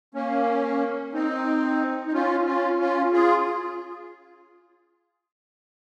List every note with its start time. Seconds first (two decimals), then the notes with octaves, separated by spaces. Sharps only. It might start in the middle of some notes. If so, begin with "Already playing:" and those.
0.14 A#3 C#4
1.14 C4 D#4
2.07 D#4
2.13 C#4 F4
2.45 C#4 F4
2.79 C#4 F4
3.12 F4 G#4